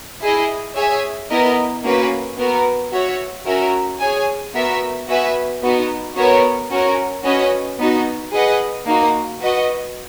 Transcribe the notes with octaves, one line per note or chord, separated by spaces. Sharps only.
E4 G#4 D#5
G#4 C#5 E5 G#5
B3 E4 A#4 D#5
A#3 C#4 F#4 B4
B3 F#4 A#4
F#4 C#5 E5
C#4 F#4 A#4 E5
G#4 C#5 G#5
B3 F#4 A#4 E5
B3 F#4 B4 E5 G#5
B3 D#4 F#4
B3 F#4 A#4 C#5
C#4 F#4 A#4
C#4 F#4 B4 D#5
B3 D#4 F#4
G#4 B4 D#5 F#5
A#3 D#4 F#4
F#4 B4 D#5 F#5